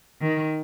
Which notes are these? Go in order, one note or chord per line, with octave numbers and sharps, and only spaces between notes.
D#3